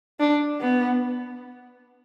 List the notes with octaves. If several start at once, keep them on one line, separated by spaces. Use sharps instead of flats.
D4
B3